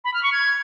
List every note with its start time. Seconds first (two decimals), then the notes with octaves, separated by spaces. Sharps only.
0.04 B5
0.14 F6
0.23 C#6
0.33 G#6